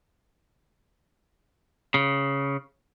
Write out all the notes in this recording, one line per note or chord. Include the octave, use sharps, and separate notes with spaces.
C#3